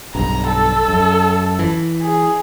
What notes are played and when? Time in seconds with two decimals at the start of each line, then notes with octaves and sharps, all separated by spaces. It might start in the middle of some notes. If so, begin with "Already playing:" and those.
0.15 B1 G2 A#5
0.48 A4
0.88 F#2
1.59 E3
2.03 G#4